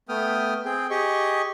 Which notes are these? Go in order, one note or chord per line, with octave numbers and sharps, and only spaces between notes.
A3 B3 G5 D#6 F6
C4 G#4 G5
G4 G#4 D#5 C#6